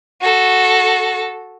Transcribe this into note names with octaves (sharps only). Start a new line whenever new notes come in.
F#4 A4